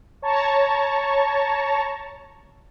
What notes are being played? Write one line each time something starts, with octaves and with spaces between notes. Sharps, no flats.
C#5 A5 A#5 C#6